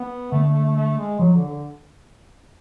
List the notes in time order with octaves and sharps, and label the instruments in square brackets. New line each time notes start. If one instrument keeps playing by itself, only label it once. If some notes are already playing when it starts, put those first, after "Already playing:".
Already playing: [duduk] B3
[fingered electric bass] D3 [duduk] A3
[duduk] A3
A3
A3
A3
G#3
[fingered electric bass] F3 [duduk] F#3
[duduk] D3
D3